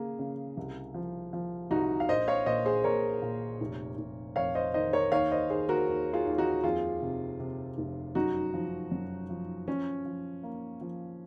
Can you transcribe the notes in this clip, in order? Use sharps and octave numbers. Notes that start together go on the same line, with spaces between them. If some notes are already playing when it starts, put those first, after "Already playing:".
Already playing: C#3 A#3 G#4
C#3
C2
F3
F3
C2 D#4 F#4
F5
A#1 C5 D#5
C#5 F5
A#2 C5 D#5
G#4 C5
A#2 A#4 C#5
A#2
F1
F1
F2 C#5 F5
C5 D#5
D#3 C5 D#5
A#4 C#5
D#2 C#5 F5
C5 D#5
D#2 G#4 C5
F#4 A#4
D#2
F4 G#4
D#2
D#4 F#4
F2 F4 G#4
C3
C3
F1
F#2 D#4 F#4
F3
F#2
F3
F3 C#4
F3
A#3
F3